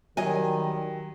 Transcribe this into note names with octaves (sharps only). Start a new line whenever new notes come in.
D#3 F#3 G3 A#4 D#5 G#5